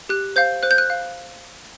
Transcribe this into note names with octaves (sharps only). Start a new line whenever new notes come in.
G4 F#6
C5 F5 G6
C5 F#6
G6
F#6
F5